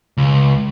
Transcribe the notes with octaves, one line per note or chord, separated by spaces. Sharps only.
C#2